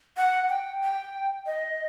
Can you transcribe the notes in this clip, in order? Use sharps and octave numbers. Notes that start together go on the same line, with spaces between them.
F#5
G5
G5
D#5